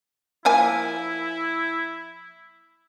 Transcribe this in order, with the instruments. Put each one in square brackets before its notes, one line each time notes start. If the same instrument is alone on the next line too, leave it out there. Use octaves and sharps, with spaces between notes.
[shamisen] F3 A#3 G#5 [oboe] E4